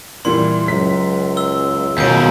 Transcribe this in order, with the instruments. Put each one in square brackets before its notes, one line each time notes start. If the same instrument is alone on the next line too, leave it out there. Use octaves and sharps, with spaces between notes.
[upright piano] A#2 E3 G3 [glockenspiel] C6
[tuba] C#2 [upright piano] F#2 B6
[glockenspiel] E6 G7
[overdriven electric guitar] D#2 B2 [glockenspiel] G6 D7